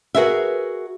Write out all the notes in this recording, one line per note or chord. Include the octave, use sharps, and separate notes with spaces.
F#4 G#4 A#4 B4 E5